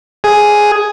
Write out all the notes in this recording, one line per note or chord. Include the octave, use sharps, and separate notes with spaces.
G#4